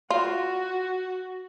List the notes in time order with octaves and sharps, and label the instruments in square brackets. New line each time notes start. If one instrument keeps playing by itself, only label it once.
[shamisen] F4 [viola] F#4